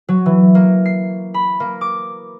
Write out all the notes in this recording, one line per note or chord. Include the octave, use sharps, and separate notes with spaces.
F#3
E3
A#3
C7
B5
A#3
D6